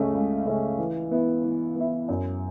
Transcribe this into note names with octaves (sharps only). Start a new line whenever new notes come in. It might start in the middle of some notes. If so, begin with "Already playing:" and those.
Already playing: C#2 C#3 A3 C#4
C#2
C#3 A3 C#4
E3
B3 E4
E3
B3 E4
F#2